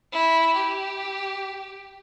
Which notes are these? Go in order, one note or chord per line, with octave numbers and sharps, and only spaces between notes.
E4
G4